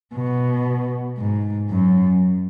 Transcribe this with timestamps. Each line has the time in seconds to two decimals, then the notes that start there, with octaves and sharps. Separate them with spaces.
0.15 B2
1.18 G#2
1.69 F#2